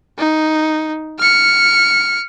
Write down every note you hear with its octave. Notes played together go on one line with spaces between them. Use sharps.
D#4
F6 C#7